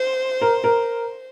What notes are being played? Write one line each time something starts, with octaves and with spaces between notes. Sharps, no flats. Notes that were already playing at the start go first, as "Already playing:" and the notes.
Already playing: C5
A#4
A#4